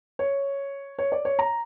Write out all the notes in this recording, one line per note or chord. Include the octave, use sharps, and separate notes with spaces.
C#5
C#5
D5
C#5
A#5